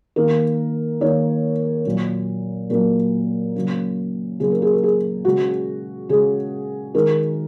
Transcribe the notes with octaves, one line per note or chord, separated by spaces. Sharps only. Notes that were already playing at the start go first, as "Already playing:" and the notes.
D#3 A#3 A#4
D#3 A#3 C#5
A#2 F#3 A#3
A#2 F#3 A#3 A#4
C#3 F#3 A#3
C#3 F#3 A#3 G#4
A#4
G#4
A#4
G#4
C#3 G#3 F#4
C#3 G#3 G#4
D#3 G#3 A#4